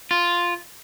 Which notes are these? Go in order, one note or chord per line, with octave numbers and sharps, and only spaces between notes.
F4